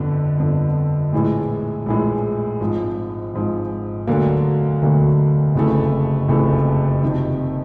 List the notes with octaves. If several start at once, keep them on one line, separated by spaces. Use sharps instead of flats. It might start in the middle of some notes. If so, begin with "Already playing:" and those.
Already playing: G1 F2 D3
G1 F2 D3
A#1 A2 E3 G#3
A#1 A2 E3 G#3
G#1 G#2 F3
G#1 G#2 F3
E1 D2 D3 F#3 A#3
E1 D2 D3 F#3 A#3
F#1 F2 C#3 E3 A3
F#1 F2 C#3 E3 A3
F2 C3 D#3